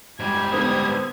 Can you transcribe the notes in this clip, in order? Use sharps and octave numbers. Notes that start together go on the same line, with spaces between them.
G#2 G3 G#6
D3 B3 C4 D#6